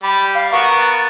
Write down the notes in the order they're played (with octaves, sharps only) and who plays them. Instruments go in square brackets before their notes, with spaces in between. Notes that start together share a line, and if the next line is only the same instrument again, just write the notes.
[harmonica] G3 [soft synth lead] B5
[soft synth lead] F5
[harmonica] B3 F#4 A#4 [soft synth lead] C#6
[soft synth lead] A6